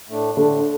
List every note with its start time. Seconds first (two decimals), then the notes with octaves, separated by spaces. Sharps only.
0.08 A2 A3 D4
0.37 A2 D3 A3 D4